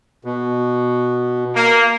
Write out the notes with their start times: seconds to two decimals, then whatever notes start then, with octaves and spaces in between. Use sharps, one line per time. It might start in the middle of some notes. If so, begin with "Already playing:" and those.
0.24 B2
1.55 A#3